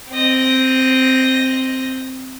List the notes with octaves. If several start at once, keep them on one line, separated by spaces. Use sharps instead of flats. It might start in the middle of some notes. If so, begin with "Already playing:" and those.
C4 D#5